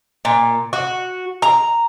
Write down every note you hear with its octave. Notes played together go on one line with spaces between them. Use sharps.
A#2
F#4
A#5